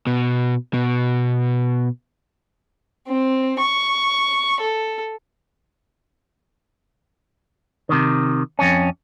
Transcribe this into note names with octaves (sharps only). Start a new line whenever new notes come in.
B2
B2
C4
C#6
A4
C3 D#3
F2 C#4